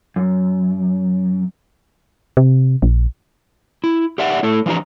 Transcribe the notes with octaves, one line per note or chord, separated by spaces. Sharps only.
F#2
C3
A#1
E4
G4 D5 E5 F#5
A3 E4 A4
E3 F3 D4 G4 A#5